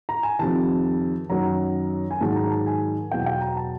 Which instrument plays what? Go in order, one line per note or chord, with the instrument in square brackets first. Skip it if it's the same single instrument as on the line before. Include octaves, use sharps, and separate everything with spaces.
[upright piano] A#5
G#5
F2 C3 D#3 A5
F#2 D#3 F#3 A#5
G#5
G#2 D#3 F#3 A5
A5
A#5
A5
G#5
E2 B2 F#3 G5
G5
A#5
A5